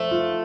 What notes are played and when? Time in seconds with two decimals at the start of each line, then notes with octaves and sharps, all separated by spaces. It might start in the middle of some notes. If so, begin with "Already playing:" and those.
Already playing: F3 A3 C5
0.11 F4